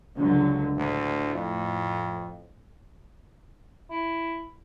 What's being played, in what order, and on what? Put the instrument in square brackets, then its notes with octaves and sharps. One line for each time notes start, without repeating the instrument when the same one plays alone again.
[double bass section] C#2 D3 F#3
[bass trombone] D2 [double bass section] A2
[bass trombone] F2
[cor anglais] E4